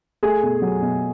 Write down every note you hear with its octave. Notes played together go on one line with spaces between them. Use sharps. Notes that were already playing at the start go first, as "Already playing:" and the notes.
A3 G#4 G#5
B2
F#3
B2